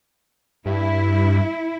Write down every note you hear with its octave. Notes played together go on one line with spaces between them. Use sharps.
G2 E4